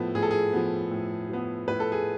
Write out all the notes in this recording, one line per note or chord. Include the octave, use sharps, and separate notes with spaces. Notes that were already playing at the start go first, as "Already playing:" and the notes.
Already playing: A2 F3 B3 A4
A2 G#4
A4
G#4
F3 B3
A2
F3 B3
A2 B4
A4
G#4